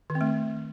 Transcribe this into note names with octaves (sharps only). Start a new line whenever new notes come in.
D#3
C4
A3